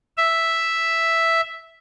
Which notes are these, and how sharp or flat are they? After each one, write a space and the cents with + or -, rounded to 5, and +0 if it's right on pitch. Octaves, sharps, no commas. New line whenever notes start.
E5 +0